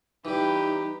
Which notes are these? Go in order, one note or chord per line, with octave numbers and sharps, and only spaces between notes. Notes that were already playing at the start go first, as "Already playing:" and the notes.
E3 G3 D#4 G4 B4